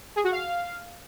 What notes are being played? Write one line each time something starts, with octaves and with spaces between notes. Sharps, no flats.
G#4
F#4
F5